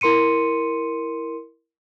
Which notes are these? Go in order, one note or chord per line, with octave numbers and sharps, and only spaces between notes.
E4 A#4 C6 C#7 D#7